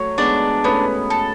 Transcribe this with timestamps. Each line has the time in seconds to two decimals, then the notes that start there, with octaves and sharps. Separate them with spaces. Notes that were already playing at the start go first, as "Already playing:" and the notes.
Already playing: F#3 A3 C#5
0.18 G#3 B3 D4
0.64 A3 B3 C#4
1.10 A4